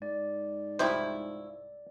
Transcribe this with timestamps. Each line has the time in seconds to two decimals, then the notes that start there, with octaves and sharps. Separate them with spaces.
0.02 G#2 D5
0.79 C2 F3 A3 E4 G4 C5